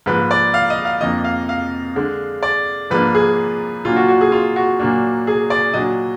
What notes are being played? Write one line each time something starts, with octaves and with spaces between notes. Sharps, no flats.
G#2 F3 A#3 B4
D5
F5
D#5
F5
F2 F3 A#3 D4 D#5
F5
F5
D3 G#3 D4
D5
G#2 F3 A#3 D4 B4
G#4
A#2 F#3 A#3 D4 F4
F#4
F#4
G#4
F4
F#4
A#2 F#3 A#3 D4
G#4
D5
A#2 F#3 D4 D#5